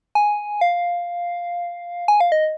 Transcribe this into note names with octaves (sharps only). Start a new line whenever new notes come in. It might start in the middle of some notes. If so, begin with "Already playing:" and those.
G#5
F5
G#5
F5
D#5